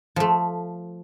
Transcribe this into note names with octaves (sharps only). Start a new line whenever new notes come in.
F3 A3